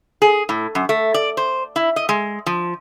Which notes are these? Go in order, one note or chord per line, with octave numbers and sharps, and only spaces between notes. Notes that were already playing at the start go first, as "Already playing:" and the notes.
G#4
A2
F#2
A3
D5
C5
E4
D#5
G#3
F3